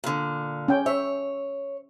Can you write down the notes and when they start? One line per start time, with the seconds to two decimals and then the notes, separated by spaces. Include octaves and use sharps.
0.04 A#2 D3
0.68 C#4 G5
0.86 C#5 E5